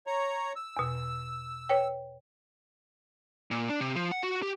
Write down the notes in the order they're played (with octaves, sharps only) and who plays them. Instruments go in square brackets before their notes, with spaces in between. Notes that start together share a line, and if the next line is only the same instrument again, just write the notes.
[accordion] C#5 A#5
E6
[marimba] E2 B2
B4 C#5 G5
[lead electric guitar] A#2
D4
C3
F3
F#5
F#4
G4